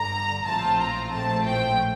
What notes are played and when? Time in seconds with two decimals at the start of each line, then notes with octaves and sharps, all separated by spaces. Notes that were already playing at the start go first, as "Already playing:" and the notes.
Already playing: G1 G2 D3 A#5
0.45 A#1 A2 F3 C4 F4 A5
0.78 A#5
1.11 A#1 A2 F3 A3 C4 A5
1.45 G5